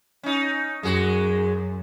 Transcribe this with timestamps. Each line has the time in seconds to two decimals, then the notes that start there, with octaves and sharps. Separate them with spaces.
0.23 C#4 D#4
0.83 F#2 G#3 F#4